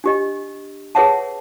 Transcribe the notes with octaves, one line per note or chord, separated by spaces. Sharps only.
D4 G4 D#5
G#4 B4 C#5 E5 F#5 A5